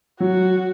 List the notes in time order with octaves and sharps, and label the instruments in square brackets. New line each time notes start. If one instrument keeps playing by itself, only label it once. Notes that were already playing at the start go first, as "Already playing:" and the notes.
[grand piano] F#3 [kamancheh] F#4